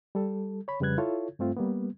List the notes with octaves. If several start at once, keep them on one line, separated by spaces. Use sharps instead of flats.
G3 A4
C#5 B5
F2 C#3 G3 B4 F#6 G#6
E4 F4 A4 C#5
G2 A3 C4 F4
G3 A#3 B3